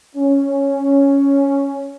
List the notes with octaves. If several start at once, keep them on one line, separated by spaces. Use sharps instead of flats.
C#4